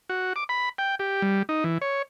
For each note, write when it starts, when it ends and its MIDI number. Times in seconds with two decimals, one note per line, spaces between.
0.10 0.33 66
0.36 0.44 86
0.49 0.69 83
0.78 0.95 79
0.99 1.22 67
1.22 1.43 55
1.49 1.64 63
1.64 1.78 52
1.82 2.02 73